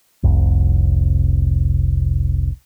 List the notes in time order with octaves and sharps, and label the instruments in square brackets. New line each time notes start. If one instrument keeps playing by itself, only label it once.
[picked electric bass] F1 C2